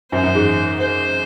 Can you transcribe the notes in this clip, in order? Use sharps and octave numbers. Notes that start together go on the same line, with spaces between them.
F#2 C5
F#2
G#2
C5